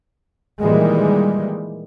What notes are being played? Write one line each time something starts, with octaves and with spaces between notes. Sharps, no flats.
A#2 D#3 E3 G3 G#3